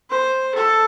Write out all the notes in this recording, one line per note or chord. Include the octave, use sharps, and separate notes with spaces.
C5
A4